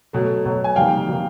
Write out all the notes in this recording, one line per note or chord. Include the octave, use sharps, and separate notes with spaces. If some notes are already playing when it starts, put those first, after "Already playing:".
B2 F#3 A3
B2 F#3 A3
G#5
F2 C3 D#3 G3 A#3 F5 G5
C3 D#3 G3 A#3